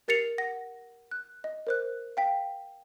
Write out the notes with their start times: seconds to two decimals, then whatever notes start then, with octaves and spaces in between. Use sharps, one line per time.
0.08 G4 A#4 A6 C7 C#7 F7
0.38 F#5 A#6
1.11 F#6
1.44 D#5
1.67 A#4 C5 F#6
2.17 F5 G5 B6